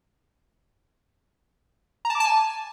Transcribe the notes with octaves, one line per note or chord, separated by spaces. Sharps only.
A#5
A5
D6
A5
G#5